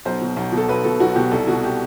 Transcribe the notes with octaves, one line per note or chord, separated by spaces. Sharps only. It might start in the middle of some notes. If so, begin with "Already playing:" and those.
B1 C5
B2
B1
B2 A4
B1 B4
B2 A4
B1 F#4
B2 G4
C2 A4
B2 F#4
G4